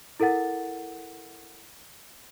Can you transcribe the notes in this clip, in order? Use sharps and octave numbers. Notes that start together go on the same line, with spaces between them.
E4 A4 A#4 F#5 A6